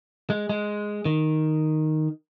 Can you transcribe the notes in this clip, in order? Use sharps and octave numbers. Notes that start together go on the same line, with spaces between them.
G#3
G#3
D#3